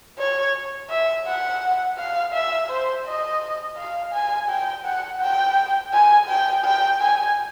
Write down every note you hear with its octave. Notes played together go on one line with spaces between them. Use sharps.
C#5
E5
F#5
F5
E5
C5
D#5
F5
G#5
G5
F#5
G5
G#5
G5
G5
G#5